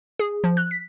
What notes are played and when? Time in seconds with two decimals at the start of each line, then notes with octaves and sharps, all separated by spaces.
0.19 G#4
0.44 F3
0.57 F#6
0.71 B6